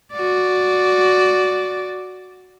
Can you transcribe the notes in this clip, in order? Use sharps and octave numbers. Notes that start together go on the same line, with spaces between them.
F#4 D5